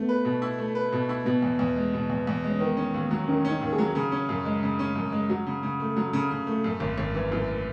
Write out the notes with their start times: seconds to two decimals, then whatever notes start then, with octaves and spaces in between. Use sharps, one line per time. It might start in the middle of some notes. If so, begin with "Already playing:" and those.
Already playing: A3 B3
0.09 B4
0.25 B2
0.42 E4
0.58 A3
0.75 B4
0.92 B2
1.09 E4
1.25 B2 B3
1.42 E2
1.59 E2
1.76 G#3
1.93 B2
2.10 E2
2.27 E2
2.44 G#3
2.50 C#4
2.60 D#3 B3
2.77 C#4
2.94 D#2
3.11 F#3
3.28 D#3 C#4
3.45 C#4
3.50 D#4
3.62 D#2
3.73 G#4
3.78 F#3
3.95 C#3 G#4
4.12 C#4
4.29 F#2
4.45 G#3
4.63 C#3
4.79 C#4
4.96 F#2
5.12 G#3
5.29 F#3 F#4
5.46 C#3
5.63 C#3
5.80 A3
5.97 F#3
6.13 C#3
6.31 C#3
6.47 A3
6.64 F#2
6.80 G#1
6.98 G#1
7.15 E3
7.31 F#2 E4